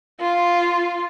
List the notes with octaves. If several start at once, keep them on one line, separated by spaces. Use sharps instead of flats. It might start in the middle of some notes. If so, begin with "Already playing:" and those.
F4